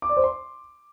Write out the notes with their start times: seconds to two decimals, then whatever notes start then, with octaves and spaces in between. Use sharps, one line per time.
0.02 D6
0.09 D5
0.17 C5
0.24 C6